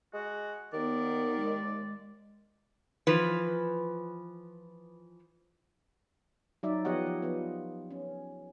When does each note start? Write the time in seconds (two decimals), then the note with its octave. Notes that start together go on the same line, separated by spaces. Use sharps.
0.14 G#3 F#4
0.73 D#2 D#3 B3 D5
1.39 G#3
3.07 E3 F3 B4
6.63 F#3 D#4 D5 E5
6.85 F3 B3 G4 C#5 D#5 F#5
7.06 F3
7.22 F3 B3
7.91 C#4